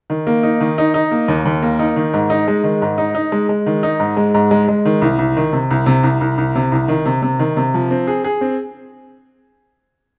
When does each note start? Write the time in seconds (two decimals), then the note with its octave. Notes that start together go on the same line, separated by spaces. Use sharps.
0.10 D#3
0.27 A#3
0.43 D#4
0.61 D#3
0.78 D#4
0.94 D#4
1.11 A#3
1.28 D#2
1.45 D#2
1.63 A#3
1.79 D#4
1.96 D#3
2.13 G#2
2.30 D#4
2.48 G#3
2.64 D#3
2.82 G#2
2.98 D#4
3.15 D#4
3.32 G#3
3.49 G#3
3.66 D#3
3.83 D#4
4.00 G#2
4.17 G#3
4.34 G#2
4.51 G#3
4.68 G#3
4.85 D#3
5.02 C2
5.19 C2
5.37 D#3
5.53 C3
5.71 C2
5.86 C3
6.03 C2
6.21 C2
6.38 C2
6.55 C3
6.72 C2
6.88 D#3
7.06 C3
7.22 C3
7.39 D#3
7.57 C3
7.74 F3
7.91 C4
8.07 G#4
8.24 G#4
8.41 C4